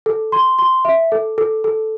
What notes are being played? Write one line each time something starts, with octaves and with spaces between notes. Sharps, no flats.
A4
C6
C6
E5
A4
A4
A4